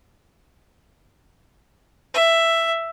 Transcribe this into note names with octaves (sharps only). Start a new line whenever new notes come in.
E5